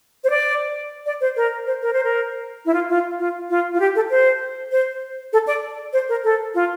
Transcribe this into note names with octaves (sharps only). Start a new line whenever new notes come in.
C5
D5
D5
C5
A#4
C5
A#4
C5
A#4
E4
F4
F4
F4
F4
F4
G4
A4
C5
C5
A4
D5
C5
A#4
A4
F4